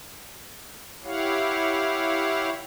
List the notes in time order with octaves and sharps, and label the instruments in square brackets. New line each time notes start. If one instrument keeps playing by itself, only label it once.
[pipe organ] E4 G4 C#5 F5 F#5